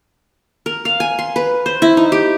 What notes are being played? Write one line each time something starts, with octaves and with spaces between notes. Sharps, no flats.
A#4
F5
G#5
C6
B4
C5
E4
D#4
G4